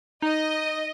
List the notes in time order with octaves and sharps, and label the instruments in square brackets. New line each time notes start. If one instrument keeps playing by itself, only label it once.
[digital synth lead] D#4 [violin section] D#5